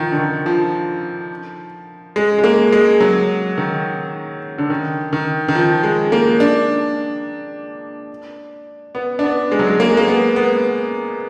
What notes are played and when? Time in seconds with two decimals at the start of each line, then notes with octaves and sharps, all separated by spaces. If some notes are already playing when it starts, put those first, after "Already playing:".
Already playing: D#3 F3
0.11 D3
0.17 D#3
0.46 F3
2.16 G#3
2.38 G#3
2.44 A#3
2.72 G#3
3.00 F#3
3.58 D#3
4.58 D3
4.70 D#3
5.13 D#3
5.48 D#3
5.55 F3
5.83 G#3
6.12 A#3
6.40 D4
8.95 B3
9.19 D4
9.23 B3
9.52 G#3
9.59 F#3
9.67 G#3
9.80 A#3
9.89 G#3
9.97 A#3
10.08 B3
10.36 B3